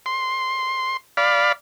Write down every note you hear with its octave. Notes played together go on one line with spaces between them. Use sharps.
C6
D5 F5 B5